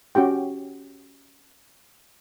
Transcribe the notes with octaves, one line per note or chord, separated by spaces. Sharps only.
C#4 F#4 G4 G5